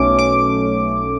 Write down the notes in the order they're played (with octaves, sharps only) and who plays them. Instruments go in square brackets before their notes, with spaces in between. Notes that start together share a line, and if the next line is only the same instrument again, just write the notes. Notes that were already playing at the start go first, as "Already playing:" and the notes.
Already playing: [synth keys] B1 B2 A3 C#4 D6
D6